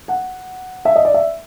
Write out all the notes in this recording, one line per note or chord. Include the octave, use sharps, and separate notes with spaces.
F#5
E5
D#5
D5
E5